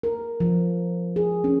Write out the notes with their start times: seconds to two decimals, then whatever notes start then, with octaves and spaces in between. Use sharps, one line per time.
0.03 A#4
0.40 F3
1.16 G#4
1.44 C#4